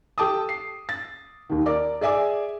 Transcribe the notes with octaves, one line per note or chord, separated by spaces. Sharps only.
G4 A4 G5 A5 D6 D#6
C7
A6
D#2 D#3
A#4 D5 D6
G#4 D5 E5 G#5 D6